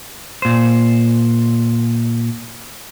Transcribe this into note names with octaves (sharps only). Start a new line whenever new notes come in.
A#2 C5